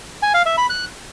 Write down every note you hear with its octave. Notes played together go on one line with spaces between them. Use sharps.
G#5
F5
E5
B5
F#6